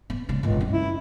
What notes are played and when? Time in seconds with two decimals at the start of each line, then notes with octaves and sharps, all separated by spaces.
0.10 B3
0.29 C#3 G#3
0.43 G1 C#2 A#2
0.60 F#2 C#4
0.72 E4